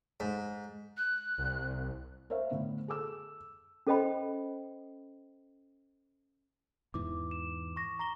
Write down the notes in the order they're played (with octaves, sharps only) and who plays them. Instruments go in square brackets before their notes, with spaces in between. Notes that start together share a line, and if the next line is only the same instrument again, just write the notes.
[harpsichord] G#2
[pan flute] F#6
[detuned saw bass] C2
[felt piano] A#4 C5 C#5 E5 F5
A2 D3 B3
G#4 A4 D6 E6
[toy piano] C#4 A4 C5 D#5 G5 B5
[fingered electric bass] E2 G#2 E3 [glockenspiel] D6
[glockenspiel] E7
C#6 A#6
A#5 A#6 G7